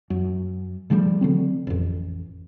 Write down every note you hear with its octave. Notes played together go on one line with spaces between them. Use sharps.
F#2
C#3 F3 G3 A3
D3 F#3 C4
A1 F2